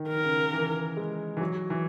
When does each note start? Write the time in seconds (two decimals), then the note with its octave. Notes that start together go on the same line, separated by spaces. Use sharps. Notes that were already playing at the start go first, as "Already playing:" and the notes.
Already playing: D#3
0.08 A#4
0.24 C#3
0.53 E3
0.97 G#3
1.37 E3
1.41 F#3
1.70 E3